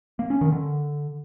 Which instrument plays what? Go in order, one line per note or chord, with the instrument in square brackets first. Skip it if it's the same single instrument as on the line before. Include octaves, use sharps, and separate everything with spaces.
[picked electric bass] A#3
C#4
D#3
D3